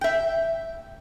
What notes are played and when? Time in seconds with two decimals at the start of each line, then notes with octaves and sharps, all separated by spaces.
0.01 E5 G5